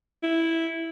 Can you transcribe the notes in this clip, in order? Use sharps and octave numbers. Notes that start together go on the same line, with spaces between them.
E4